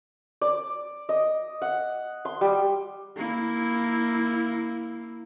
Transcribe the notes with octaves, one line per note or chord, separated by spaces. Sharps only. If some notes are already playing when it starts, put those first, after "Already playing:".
D5
D#5
F#5
C6
G3
A#3 E4